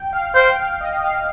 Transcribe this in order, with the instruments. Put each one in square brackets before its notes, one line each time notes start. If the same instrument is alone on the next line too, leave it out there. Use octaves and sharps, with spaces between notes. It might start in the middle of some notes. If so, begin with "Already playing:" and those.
Already playing: [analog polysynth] G5
F5
[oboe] C5 [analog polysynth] G5
[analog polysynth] G5
F5
D#5
F5